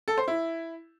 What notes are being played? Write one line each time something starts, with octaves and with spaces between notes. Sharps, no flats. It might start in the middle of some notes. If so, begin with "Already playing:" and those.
A4
C5
E4